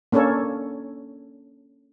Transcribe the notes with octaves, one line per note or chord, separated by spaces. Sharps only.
A#3 C#4 D4 A4 C#5